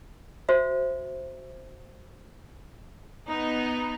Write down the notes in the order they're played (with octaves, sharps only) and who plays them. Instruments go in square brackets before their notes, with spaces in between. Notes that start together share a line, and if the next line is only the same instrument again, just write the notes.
[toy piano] F#4 C5 E5
[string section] B3 D#4